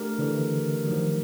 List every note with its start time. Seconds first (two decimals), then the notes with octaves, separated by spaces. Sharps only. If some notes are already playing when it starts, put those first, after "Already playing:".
Already playing: A3 D4 G4 A#4
0.19 D3 E3
0.86 F#3
0.91 D#3 F3